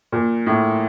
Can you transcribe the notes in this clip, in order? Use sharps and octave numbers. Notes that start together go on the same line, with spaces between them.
A#2
A2